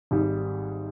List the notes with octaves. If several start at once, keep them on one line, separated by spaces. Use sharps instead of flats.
G#1 G#2 G3